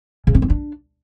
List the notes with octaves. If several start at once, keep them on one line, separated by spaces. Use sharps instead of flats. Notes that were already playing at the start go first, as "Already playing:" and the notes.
C#3
C#4
C4
D4